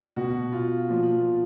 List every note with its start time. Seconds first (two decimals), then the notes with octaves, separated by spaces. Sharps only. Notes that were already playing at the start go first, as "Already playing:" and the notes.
0.16 B2 F#4
0.52 F4
0.89 A#2 F3